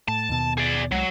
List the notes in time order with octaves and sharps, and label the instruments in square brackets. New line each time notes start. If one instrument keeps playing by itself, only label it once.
[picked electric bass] A2 [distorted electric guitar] A5
[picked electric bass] D#2 B2
[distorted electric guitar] G#4 D5
[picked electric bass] C2 G#3 [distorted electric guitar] F#3